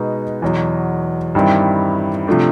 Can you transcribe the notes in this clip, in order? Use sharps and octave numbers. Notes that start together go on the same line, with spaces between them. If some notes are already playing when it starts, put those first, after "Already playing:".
Already playing: B2 G#3 B3 D#4
E2 B2 F#3
G2 D#3 G3 C4 E4
C3 F3 A3 D4